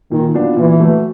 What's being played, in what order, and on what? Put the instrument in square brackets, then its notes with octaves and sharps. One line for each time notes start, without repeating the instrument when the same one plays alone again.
[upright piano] A#2 [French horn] D#3
[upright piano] F#3 B3 D4 F4
[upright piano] A#2 [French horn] E3
[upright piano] F#3 A3